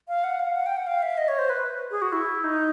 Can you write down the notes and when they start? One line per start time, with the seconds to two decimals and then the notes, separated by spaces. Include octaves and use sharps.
0.08 F5
0.24 F#5
0.39 F5
0.55 F#5
0.66 G5
0.77 F#5
0.87 F5
1.02 E5
1.18 D#5
1.28 C#5
1.39 C5
1.50 B4
1.91 G#4
2.02 F#4
2.12 E4
2.44 D#4